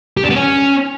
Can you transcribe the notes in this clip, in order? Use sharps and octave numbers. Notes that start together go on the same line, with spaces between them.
G4
D4
B3
C#4